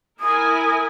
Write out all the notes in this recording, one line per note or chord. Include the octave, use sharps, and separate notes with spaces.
E4 A#4 G#5 D#6